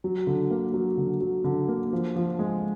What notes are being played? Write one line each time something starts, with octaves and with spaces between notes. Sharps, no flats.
F#3
D3
A#3
F#3
D3
F#3
D3
A#3
F3
F3
G#3